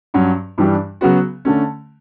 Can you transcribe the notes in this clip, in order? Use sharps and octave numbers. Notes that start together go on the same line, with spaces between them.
G2 F#3 C#4
G2 E3 G3 D4 G4
C#3 F#3 B3 F#4
D3 A3 C#4